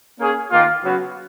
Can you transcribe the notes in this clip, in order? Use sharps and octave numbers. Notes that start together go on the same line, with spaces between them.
A#3 C#4 G#4
D#3 A#3 F4
C#3 F#3 B3